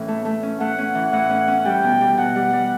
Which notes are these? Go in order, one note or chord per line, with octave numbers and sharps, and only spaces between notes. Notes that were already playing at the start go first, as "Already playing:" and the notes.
Already playing: A2 E3 C#4
A3
A3
C#4
A3 F#5
C#4
E3
A2 F#5
C#4
C#4
G3 G5
B2
G3
B2 F#5
G3
G3